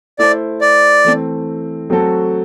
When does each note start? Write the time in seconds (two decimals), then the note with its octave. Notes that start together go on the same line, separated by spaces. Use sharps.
0.19 A3 E4 A4 C5 D5
0.61 D5
1.04 E3 A3 C4
1.90 F#3 A3 C4 F#4 A4